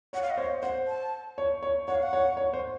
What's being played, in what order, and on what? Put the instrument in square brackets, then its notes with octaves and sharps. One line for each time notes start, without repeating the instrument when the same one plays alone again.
[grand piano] C#5 [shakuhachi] F#5
[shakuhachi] F5
D#5
[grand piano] C5 [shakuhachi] C#5
[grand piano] C5 [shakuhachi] F#5
[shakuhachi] A5
[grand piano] C#5
C#5
[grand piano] C#5 [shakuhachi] F#5
[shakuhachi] F5
F#5
[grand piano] C#5
C#5
C5